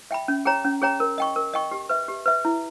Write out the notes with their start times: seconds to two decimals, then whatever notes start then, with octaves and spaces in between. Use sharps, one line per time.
0.11 E5 G5 B5
0.28 C#4
0.45 G#4 C#5 G5 A#5
0.65 C#4
0.82 G#4 C#5 G5 A#5
1.00 A#4
1.18 D#5 G5 C#6
1.36 A#4
1.54 D#5 G5 C#6
1.71 G4
1.89 B4 E5
2.08 G4
2.26 B4 E5
2.45 E4